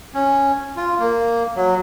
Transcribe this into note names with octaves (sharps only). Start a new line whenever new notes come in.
C#4
F4
A#3
F#3